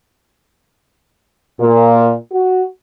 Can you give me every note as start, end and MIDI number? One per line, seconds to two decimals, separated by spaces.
1.60 2.12 46
2.32 2.62 66